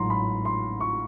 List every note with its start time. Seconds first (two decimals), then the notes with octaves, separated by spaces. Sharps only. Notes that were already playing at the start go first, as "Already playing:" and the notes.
Already playing: A1 G#2 F#3 A#5 C6
0.10 B5
0.45 C6
0.81 C#6